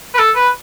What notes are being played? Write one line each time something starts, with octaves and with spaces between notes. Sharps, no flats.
B4
A4
B4